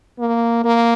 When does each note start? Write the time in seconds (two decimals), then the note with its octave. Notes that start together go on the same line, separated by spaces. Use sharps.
0.19 A#3
0.64 A#3